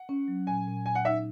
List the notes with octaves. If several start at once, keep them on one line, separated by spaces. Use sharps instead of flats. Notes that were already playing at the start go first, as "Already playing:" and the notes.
Already playing: F#5
C#4
F#3
A#2 G#5
A#2
A#2 G#5
F#5
D#4 E5